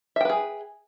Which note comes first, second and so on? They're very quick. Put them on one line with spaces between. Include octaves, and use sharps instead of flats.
E5 G5 B4 G#4